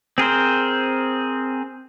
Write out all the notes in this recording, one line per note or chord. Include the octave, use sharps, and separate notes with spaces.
C4 G#4 A#4 C5